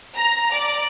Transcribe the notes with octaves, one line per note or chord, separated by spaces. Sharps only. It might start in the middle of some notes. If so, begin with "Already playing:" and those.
A#5
D5